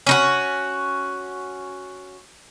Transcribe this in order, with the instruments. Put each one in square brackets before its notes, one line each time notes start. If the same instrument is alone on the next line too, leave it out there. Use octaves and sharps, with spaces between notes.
[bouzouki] C#4 D#4 F#4